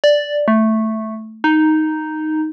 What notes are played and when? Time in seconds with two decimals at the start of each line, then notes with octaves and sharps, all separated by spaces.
0.04 D5
0.48 A3
1.44 D#4